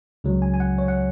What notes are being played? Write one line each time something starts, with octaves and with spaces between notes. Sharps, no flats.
C#2 C#3 F#3
G#5
G#5
F#5
C#5
F#5